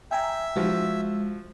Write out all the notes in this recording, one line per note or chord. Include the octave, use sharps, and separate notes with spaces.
E5 G5 G#5 A#5
F3 G#3 F#4